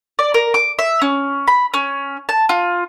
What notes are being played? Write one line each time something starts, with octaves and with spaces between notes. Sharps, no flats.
D5
A#4
D6
E5
C#4
B5
C#4
A5
F4